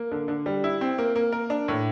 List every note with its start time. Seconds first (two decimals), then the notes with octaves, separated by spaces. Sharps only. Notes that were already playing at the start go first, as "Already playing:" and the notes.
Already playing: A#3
0.12 D3
0.28 D3
0.46 G3
0.64 E4
0.81 C4
0.98 A#3
1.15 A#3
1.32 A#4
1.50 D4
1.68 A2